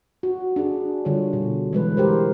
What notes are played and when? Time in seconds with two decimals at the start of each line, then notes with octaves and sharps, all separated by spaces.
0.23 F#4
0.56 D4 G#4
1.05 D3 G3 F4 C#5
1.33 B2
1.73 E3 G#3 B4
1.97 G4 A#4 C5